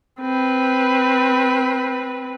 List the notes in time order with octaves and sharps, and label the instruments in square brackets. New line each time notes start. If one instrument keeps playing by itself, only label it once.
[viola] C4 B4